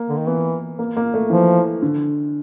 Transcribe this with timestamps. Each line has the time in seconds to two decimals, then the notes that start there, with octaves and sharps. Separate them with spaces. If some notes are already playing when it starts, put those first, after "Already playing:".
Already playing: A#3
0.09 D3
0.18 D#3
0.27 E3 B3
0.79 A#3
0.97 A#3
1.14 A3
1.30 E3 F3
1.82 D3